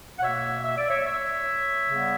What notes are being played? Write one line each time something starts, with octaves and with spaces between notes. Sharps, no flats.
F#5
B2 A#3 C#5 E5
E5
D5
C#5 E5
C#5 E5
C#3 G3 B3